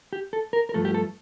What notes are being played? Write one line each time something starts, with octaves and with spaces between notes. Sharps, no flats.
G4
A4
A#4
A#4
G2 F3 A3 A4
G4
A4